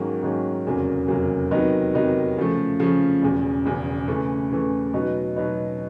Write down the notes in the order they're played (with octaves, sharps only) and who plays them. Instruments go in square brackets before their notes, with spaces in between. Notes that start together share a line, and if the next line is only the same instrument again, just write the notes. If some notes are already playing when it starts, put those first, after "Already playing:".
Already playing: [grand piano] G#2 D#3 F#3 A#3 C#4
G#2 D#3 F#3 A#3 C#4
F1 E2 C#3 F#3 A#3
F1 E2 C#3 F#3 A#3
C3 D#3 F#3 B3 D#4
C3 D#3 F#3 B3 D#4
C#3 F3 A3
C#3 F3 A3
E1 E2 C#3
E1 E2 C#3
C#3 E3 A3
C#3 E3 A3
B2 F#3 B3 D#4
B2 F#3 B3 D#4